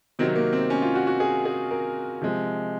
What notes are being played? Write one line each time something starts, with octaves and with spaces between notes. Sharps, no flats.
C3 D#3 F#3 C4
A#3
C4
C#4
F4
F#4
F#4
G#4
G#4
A#4
C3 F3 G#3